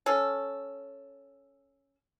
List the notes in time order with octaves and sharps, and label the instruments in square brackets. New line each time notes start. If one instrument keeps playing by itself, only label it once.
[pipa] C#4 A4